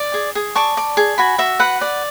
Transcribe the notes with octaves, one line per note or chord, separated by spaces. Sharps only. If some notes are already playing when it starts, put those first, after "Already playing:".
Already playing: D5
G#4
G#4
D5 A5 C#6
D5
G#4
F#4 G#5 B5
F#4 E5
B4 F#5
D5 F#5